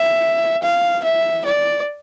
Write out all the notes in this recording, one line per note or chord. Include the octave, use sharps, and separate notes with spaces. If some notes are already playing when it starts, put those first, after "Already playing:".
Already playing: E5
F5
E5
D5